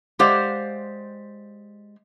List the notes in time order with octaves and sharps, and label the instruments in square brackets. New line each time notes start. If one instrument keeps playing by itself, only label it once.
[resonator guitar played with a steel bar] G#3 G4 C5 D5 F5 F#5